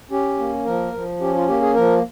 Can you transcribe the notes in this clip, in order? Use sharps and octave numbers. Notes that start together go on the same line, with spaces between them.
C#4 G4
A#3
F3 A#4
F3
C#4 G4
F4
A#3 G4
G#4
F3 A#4